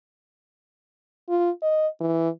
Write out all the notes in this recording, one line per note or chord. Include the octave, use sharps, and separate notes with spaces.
F4
D#5
E3